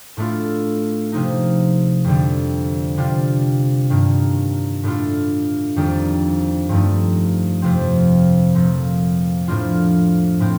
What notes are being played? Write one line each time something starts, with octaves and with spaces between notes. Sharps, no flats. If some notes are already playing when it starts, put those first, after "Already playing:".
A2 A3 D4 F4
C3 F3 A#3 D#4
F2 D3 G3
C3 G3 D4 F4
G2 D#3 A#3
A2 A3 D4 F4
F2 D#3 G3 A#3 D4
G2 F3 A3 D#4
F2 C3 F3 C4
A#2 F3 A3
A2 F3 A#3 D4 F4
A2 F3 C4